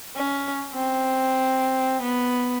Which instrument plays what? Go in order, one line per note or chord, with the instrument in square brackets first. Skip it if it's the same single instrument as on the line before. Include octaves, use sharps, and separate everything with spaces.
[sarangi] C#4
C4
B3